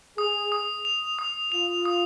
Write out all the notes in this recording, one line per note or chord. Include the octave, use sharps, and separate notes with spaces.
G#4 D#6
D#6
F7
D#6
F4 F7
D#6